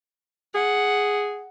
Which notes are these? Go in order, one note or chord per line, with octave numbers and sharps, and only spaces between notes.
G#4 F#5